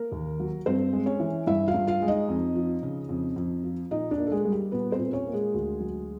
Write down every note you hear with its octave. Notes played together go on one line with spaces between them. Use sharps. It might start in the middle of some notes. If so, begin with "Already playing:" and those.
Already playing: A#3 A#4
D#2
F#3
G2 C4 C5
G#3
C#4 C#5
E3
G2 E4 E5
F4 F5
G2
F4 F5
G#3
D#4 D#5
F2
F3
C#3
F2
F2
F3
A#2 D#4 D#5
D4 D5
A#3
A4
G#3 G#4
G3
G4
A#2 B3 B4
C4 C5
A#2
C#4 C#5
A#3
G#3 G#4
D2
F#3